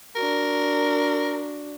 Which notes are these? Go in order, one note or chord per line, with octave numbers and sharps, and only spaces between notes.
D4 F#4 A#4